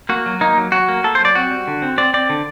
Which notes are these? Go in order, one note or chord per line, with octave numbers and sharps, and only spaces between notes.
A#3 F#4
F#3
A#3 D#4
F#3
F#3 F#4
A#3
A#3 A4
C5
F#3 D5
C4 F#4
G3
D3
C4
C4 D5
C4 D5
D3